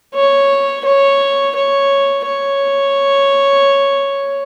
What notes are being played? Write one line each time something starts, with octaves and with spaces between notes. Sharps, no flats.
C#5
C#5
C#5
C#5